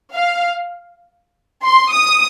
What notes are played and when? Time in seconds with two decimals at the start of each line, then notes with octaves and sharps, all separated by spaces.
0.14 F5
1.63 C6
1.92 D#6